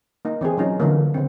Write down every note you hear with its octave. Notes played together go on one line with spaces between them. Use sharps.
A#3 D#4
E3 C4 G4 G#4
F#3 C#4 D#4 F4
D3 E3 F3 A#3
C#3 C4